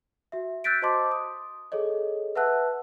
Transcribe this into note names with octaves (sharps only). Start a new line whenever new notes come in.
F#4 E5
E6 F#6 G6 A6 B6 D7
F#4 C5 D#5 A5 C6 D6
D#6
G#4 A4 C#5 D#5
B4 E5 F#5 A5 E6 F#6